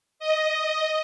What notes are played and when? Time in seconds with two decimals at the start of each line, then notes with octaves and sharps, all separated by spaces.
0.19 D#5